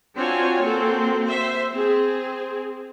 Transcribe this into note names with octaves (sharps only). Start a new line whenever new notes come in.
C4 D4 F4 F#4 C#5 G#5
A#3 C4 F#4 A4
C5 E5
C4 G#4